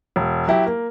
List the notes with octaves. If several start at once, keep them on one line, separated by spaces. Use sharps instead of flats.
E1
F#3 E4 G4
A#3